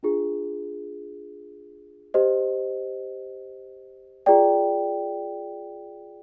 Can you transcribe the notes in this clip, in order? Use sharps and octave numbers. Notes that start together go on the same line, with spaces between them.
D4 F4 G#4
G4 C5 D#5
F4 G#4 D5 G5